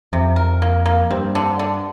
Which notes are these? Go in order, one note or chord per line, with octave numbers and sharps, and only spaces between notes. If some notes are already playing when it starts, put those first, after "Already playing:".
F2 C3
A#4
A#3
A#3
G2 C4
D3
D3